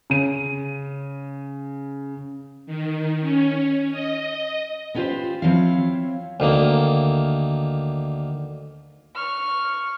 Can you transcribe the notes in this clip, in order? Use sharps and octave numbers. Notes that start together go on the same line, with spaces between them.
C#3 D#7
D#3
C#4
D#5
B3 C#4 F4 G4 B4 C5
F3 C4 E4 C#5 F5
D2 D#3 A#3
C#6 F6